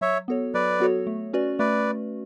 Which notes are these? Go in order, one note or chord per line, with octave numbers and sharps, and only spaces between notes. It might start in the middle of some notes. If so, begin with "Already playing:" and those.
F#3 C#5 E5
B3 F#4 A4 C#5
F#3 B4 D5
B3 F#4 A4 C#5
A3
C#4 F#4 B4 D5
A3 B4 D5